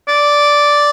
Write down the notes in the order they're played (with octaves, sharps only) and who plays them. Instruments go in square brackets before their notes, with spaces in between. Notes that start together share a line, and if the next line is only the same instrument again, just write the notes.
[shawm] D5